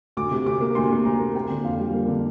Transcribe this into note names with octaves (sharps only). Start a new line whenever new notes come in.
D2 D6
C3
D2 D6
A#3
D2 C6
C3
D2 A#5
A#3
A#3 G5
D3
F2 F5
G3
A#3
D3